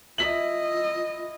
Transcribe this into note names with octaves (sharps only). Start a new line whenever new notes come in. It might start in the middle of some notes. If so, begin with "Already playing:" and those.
E4 F4 D#5 B6 F#7